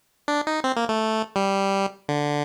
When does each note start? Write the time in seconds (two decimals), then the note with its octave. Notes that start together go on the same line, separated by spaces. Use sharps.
0.28 D4
0.47 D#4
0.64 C4
0.76 A#3
0.89 A3
1.36 G3
2.09 D3